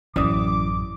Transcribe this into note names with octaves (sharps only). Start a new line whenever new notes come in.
A1 F#2 E3 C#4 D5 D6 D#6